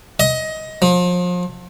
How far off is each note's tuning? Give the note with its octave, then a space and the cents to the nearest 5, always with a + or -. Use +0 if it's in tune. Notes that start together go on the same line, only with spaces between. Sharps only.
D#5 +20
F3 +35